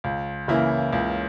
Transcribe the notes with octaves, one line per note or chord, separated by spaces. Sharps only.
C#2
C#3 E3 A#3 E4
C#2